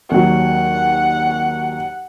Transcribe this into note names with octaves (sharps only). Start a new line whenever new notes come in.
D#2 F#3 F#5